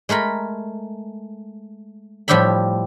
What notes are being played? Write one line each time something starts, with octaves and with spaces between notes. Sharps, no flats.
G#3 A3 A#4 B5
A2 F3 G3 G4 E5 B5